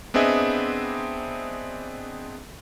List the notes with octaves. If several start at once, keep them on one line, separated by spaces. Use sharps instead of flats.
B3 C4 D4 G#4 D#5 E5